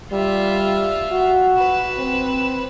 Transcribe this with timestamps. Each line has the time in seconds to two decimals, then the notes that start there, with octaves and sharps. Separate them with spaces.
0.12 G3 F4 E5
1.11 F#4
1.58 B4 E7
1.98 C4